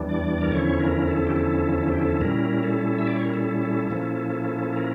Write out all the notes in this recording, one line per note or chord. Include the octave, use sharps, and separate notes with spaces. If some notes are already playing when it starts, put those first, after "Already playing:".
Already playing: E2 E3 G3 D4
D5
A#4
E2 D3 F3 C#4 E4 C#5
A#4
A4
G4
A4
A4
G4
A4
A#2 G3 C#4 E4 A#4
A4
E5
D5
C#5
A#4
A4
A4
A#2 F3 A#3 C#4 E4
A#4